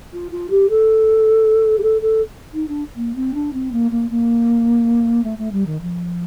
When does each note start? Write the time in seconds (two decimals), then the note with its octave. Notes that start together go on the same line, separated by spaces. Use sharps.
0.13 F4
0.31 F4
0.50 G4
0.69 A4
1.78 G4
1.82 A4
2.01 A4
2.53 D#4
2.68 D4
2.96 A#3
3.15 C4
3.34 D4
3.53 C4
3.72 A#3
3.91 A#3
4.10 A#3
5.23 A3
5.38 A3
5.52 G3
5.66 D#3
5.81 F3